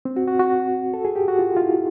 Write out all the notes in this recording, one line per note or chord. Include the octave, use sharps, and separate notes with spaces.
C4
F#4
F#4
F#4
A4
G#4
G4
F#4
F4
F4
E4